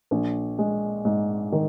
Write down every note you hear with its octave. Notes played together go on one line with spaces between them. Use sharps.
A#1
G#3
G#2
D#3